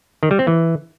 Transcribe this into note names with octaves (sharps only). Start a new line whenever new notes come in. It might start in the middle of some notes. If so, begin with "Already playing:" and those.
D#3
G3
C4
E3